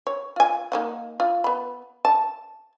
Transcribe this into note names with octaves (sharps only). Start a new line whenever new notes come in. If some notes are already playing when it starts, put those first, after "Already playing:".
C#5
F4 G#5
A#3 D#4 F#5
F4
B3 B5
A5